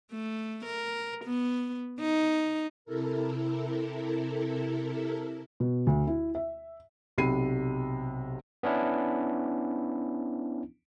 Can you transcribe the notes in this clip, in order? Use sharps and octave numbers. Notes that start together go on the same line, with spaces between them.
A3
A#4
B3
D#4
C3 E4 A4 A#4
B2
D2
E4
E5
B1 C3 B5 C7 D#7
B3 C#4 D4 E4